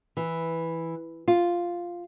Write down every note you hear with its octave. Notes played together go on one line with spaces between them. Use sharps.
E3
F4